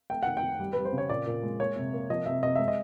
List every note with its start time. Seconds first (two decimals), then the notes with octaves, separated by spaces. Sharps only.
0.10 A3 G5
0.23 D#3 F#5
0.37 G5
0.43 D#3
0.60 G3
0.73 G3 B4
0.85 C5
0.93 C#3
0.98 C#5
1.09 A#2 D5
1.27 A#2
1.43 G#3
1.60 A#3 C#5
1.76 C3
1.93 A#3
2.10 F3 D#5
2.26 C3 E5
2.43 C3 D#5
2.56 G#3 E5
2.68 D#5